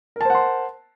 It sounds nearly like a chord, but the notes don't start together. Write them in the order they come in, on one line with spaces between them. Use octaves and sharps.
A#4 A5 C5 F#5 C6